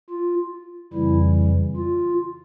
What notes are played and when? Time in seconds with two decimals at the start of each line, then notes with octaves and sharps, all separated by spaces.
0.10 F4
0.93 F2 C#3 E3 G3 E4
1.76 F4